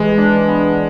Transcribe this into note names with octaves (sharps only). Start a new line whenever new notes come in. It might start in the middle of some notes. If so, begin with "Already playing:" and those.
Already playing: E3 G#3
D4
B3